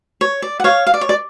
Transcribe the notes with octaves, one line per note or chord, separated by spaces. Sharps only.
C#5
D5
F#5
C#5 F5
F5
D5
C#5
D5